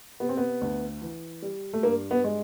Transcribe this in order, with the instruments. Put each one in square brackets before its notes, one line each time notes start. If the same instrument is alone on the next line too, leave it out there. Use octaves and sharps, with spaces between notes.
[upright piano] C3 B3
C4
B3
D2
E3
G3
A3
G2 A#3
B3
G#3